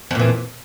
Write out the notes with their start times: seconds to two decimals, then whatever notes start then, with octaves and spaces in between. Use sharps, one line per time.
0.11 F2
0.15 A#2
0.19 E3